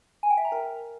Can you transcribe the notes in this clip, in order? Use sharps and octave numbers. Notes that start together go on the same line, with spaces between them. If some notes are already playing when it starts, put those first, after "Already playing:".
G#5
G5
E5
A#5
A#4